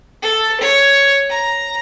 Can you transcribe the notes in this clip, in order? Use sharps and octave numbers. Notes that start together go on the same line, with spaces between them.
A4
C#5
A#5